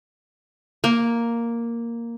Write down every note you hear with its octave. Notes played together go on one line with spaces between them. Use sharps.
A#3